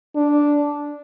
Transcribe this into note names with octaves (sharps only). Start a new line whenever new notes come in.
D4